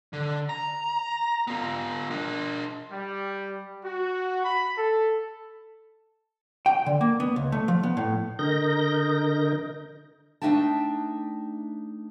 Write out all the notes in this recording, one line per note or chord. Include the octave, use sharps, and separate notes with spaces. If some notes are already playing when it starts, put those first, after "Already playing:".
D3
A#5
B3 F4
D4 A#4
G3
F#4
B5
A4
G5
D3
A#3
B3
C#2
A3
F3
B3
A2
D3 A#4 D#5 G6 A#6
A3 D4 D#4 E5 G5 A5